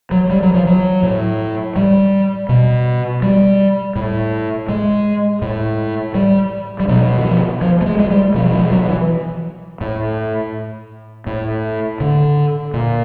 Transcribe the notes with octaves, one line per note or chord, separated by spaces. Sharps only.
F#3
G3
F#3
F3
F#3
A2
G3
B2
G3
A2
G#3
A2
G3
G3
B2 F#3
E3
F3
F3
A3
G#3
G#3
G3
B2 F3
F3
F#3
E3
A2
A2
D3
A#2